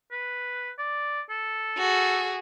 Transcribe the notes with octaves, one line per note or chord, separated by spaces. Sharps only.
B4
D5
A4
F#4 G#4